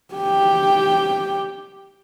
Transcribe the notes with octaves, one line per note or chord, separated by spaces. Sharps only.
G4 G5